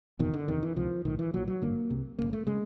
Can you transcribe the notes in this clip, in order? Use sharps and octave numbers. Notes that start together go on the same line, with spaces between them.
F#1 E2 B2 D#3
D3
F#1 E2 C3 D#3
E3
C#2 C3 F3
B1 A2 D#3
E3
B1 A#2 F#3
F#3
G#1 G2 D3 A#3
C2 C3
G1 F#2 C#3 A#3
A3
C#3 G#3